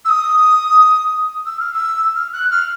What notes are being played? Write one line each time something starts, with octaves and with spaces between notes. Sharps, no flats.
E6
D#6
E6
F6
E6
F6
F#6
F6